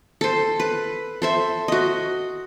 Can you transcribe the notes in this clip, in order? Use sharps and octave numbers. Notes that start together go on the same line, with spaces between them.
A4 C5
B4
A4 C5 E5
F#4 D#5